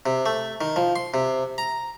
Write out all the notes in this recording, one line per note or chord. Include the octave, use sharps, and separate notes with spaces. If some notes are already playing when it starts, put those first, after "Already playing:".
C3
A3
D#3
F3
C6
C3
A#5